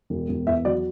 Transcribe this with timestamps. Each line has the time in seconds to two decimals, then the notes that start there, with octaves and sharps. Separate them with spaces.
0.10 E1
0.29 E1
0.47 E2 E5
0.65 F#3 D5